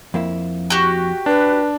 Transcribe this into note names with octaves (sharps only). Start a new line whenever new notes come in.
F2 A#3 E4
F#4 G4
D4 B4